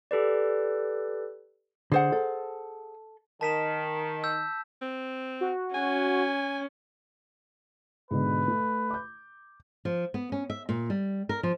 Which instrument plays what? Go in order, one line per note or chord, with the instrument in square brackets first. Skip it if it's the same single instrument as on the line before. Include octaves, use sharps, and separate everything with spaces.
[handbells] G4 A4 B4 D5
[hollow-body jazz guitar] D3 [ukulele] G#4 C5 F#5
[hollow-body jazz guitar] A4
[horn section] D#3 [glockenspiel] A5 B6 E7
[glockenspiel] E6 G6
[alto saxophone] C4
[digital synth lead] F#4
[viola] C#4 [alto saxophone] G#5
[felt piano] G#2 B2 D3 [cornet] B4
[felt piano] A3
D6 G6
[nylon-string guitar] F3
B3
C#4
E5
A#2
G3
A#4
F3